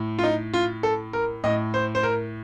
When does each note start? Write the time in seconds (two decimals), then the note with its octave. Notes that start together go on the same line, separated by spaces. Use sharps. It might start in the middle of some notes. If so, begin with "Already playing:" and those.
Already playing: A2
0.19 F4
0.23 D#4
0.54 F4
0.83 A4
1.13 A#4
1.44 A2 D#5
1.74 C5
1.95 C5
2.03 A#4